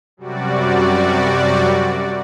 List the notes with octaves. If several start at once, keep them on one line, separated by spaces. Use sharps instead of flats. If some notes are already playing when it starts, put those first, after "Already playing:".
F#2 C3 G3 F#4 D5